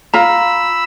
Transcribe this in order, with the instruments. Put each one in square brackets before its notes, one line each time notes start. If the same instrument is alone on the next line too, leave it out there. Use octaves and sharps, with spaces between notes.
[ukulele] F4 A#5 [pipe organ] B5 E6